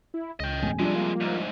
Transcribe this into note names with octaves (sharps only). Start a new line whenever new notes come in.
E4
C#2 D#5 G5
E1 A1 G#5
C3 F3 G3 G#3 D4
A#3
D2 G#2